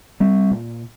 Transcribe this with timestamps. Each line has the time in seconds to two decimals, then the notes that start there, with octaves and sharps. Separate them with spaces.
0.20 G3 C4
0.51 A#2